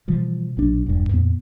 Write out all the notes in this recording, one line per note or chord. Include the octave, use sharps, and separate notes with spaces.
B2 E3 F3 G3
A#1 B2 F#3 D4
E1 G2
F2 A#2 B3